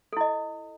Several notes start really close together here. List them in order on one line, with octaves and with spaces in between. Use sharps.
A4 E4 D#5